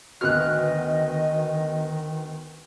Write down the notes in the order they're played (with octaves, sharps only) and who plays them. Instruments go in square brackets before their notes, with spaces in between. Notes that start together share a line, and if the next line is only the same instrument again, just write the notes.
[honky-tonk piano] D2 B3 F#4 [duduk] D#3 [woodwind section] D#5 [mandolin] F6 F#6